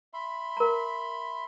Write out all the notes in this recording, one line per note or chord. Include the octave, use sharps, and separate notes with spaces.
E5 B5 C6
A#4 A#5